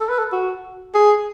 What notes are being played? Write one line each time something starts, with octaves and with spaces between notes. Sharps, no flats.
A4
B4
A4
F#4
G#4